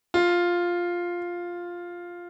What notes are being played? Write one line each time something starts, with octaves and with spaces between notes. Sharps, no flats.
F4